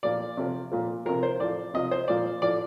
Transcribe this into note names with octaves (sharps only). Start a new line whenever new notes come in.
A#2 F3 D5
C3 F3
A#2 F3
C3 F3 A#4
C5
A2 F3 D5
C3 F3 D#5
C5
A#2 F3 D5
A2 F3 D5